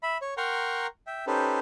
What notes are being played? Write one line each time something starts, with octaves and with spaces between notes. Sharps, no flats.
E5 B5
C#5
A#4 F#5 G5 A#5 C6 C#6
E5 G5
C#4 D#4 G4 A4 B4 C5